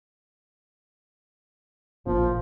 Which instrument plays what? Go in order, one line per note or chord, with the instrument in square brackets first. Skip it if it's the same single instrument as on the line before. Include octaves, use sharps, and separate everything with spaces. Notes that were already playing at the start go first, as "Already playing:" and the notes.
[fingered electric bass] A1 A#2 [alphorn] F3